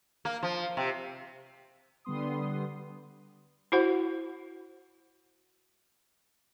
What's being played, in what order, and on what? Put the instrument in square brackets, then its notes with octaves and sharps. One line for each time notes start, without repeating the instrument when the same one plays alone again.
[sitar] A#3
F3
C3
[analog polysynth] D3 G3 B3 C6 D#6
[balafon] E4 F#4 C5 F#5